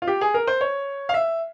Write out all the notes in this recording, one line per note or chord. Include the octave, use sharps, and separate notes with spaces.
F4
G4
G#4
A#4
C5
C#5
F5
E5